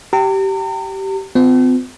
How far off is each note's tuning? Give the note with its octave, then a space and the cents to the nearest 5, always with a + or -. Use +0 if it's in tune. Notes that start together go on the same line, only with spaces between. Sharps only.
G4 -20 A#5 -40
C4 -45 F4 +25